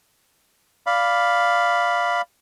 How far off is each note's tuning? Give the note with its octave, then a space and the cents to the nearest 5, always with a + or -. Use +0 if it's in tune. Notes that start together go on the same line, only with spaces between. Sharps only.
D5 +0 F5 +0 B5 +0